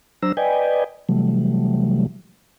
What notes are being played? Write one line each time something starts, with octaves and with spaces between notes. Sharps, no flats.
F#3 D4 C5 A#5 E6
B4 D5 D#5 G5 G#5
C3 E3 F#3 G3 A3